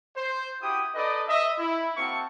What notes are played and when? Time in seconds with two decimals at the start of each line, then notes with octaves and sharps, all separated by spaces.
0.17 C5
0.62 E4 F#4 G4 G5 D#6
0.95 D#4 A4 B4 D5 D#5
1.28 D#5 E5
1.59 E4
1.97 A#3 C4 F#4 E5 A5 C#6